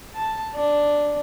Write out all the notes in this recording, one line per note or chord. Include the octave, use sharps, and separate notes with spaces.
A5
D4